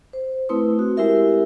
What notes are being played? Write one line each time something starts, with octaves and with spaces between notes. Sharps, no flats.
C5
A3 C4 E4 B4 C6 D#6
F#4
G#3 C4 E4 G4 A#4 E5